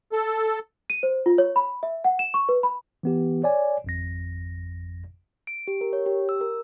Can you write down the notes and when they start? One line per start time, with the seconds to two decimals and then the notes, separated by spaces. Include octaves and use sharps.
0.12 A4
0.90 D#7
1.03 C5
1.26 F4
1.38 C#5
1.56 B5
1.83 E5
2.04 F#5
2.19 E7
2.34 C#6
2.49 B4
2.63 B5
3.03 E3 B3 G4
3.44 C#5 D5 G#5
3.84 G#1 F2 A#6
5.47 D7
5.68 G4
5.81 A#4
5.93 C#5
6.06 G4
6.29 E6
6.41 A#4